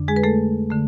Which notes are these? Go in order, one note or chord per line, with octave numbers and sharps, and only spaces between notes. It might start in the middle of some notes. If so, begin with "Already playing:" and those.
Already playing: F2 D3 D4
G#3 G#4
B4
A3 A4
D3 A3